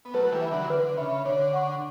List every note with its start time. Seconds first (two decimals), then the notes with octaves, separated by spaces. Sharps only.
0.05 B3
0.14 F#3 A3 B4
0.27 A3
0.32 E3 G3
0.41 E5 B5
0.51 D3 F#3
0.63 E3
0.70 D3 B4
0.97 C#3 E5 B5
1.25 D3 C#5
1.53 F#5 C#6